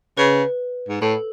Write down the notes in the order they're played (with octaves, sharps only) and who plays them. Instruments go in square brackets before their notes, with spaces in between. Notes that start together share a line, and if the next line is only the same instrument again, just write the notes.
[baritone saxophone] C#3 [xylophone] B4
[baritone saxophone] G#2
[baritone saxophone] A2 [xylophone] A4